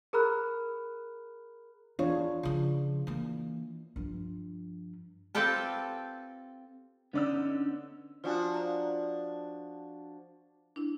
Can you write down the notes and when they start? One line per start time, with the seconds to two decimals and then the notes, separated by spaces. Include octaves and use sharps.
0.13 G#4 A#4 A#5 B5 F6 F#6
1.99 E2 D4 F4 C#5
2.43 C#3 F3
3.07 E3 A#3
3.96 G2 F3
5.35 C4 F4 G4 A4 B4 A5
7.13 D3 B3 C#4 D#4 D5 E6
8.24 F3 D4 F4 F#4 D5 G#5
8.54 F5 A#5
10.76 D4 E4